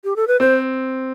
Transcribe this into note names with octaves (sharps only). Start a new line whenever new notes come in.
G4
A4
B4
C4 C5